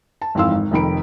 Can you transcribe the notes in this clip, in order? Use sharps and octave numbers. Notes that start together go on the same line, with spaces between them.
A5
G#1 F2 E3 F5 C6 E6
G#1
F1 F2 D#3 B5 D7